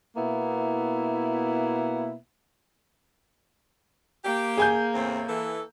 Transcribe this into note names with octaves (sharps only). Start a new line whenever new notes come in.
B2 A#3 B3 E4
A#3 G4
G#4 G#5 G6
E2 A2 C4
E3 A4